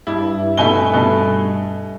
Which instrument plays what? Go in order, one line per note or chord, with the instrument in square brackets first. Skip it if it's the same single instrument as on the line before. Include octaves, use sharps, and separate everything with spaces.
[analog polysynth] G2 [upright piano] E4
[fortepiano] B2 E5 [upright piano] A3 G#5 G7
[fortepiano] B2 A4